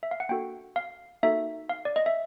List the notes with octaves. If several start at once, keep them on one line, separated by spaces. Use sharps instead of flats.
E5
F5
F#5
A#3 D4 F#4 A4 G5
F5
A#3 D#4 F#4 A4 E5
F5
D5
D#5
E5